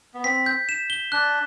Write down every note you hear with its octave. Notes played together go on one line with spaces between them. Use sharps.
B3
C4 B6
G6
E7
G7
D4 F#6